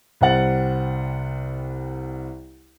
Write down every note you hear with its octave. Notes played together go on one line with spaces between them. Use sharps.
C2 G3 C5 F#5 A6 F#7